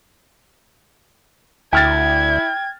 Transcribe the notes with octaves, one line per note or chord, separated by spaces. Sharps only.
D2 E4 G5 F6 G#6 A6